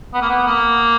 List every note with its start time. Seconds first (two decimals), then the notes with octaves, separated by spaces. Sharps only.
0.14 B3
0.22 A#3
0.28 B3
0.47 A#3